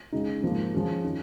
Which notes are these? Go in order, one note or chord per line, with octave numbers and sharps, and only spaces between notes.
C#3 G#3 D#4
G#2 F3 A#3 F4
F3 C#4 G#4
D#3 C#4